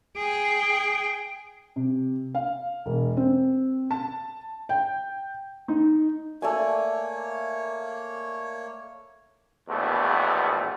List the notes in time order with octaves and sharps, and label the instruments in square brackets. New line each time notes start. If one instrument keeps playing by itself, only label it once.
[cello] G#4 G5
[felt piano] C3
F5
E1
C4
A5
G5
D#4
[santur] A3 D5 G#5 [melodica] A#3 C#5
[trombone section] A#1 E2 G2 B2 A3